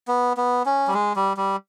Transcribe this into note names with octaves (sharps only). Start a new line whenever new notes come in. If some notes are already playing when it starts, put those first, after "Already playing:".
B3
B3
C#4
G3
G#3
G3
G3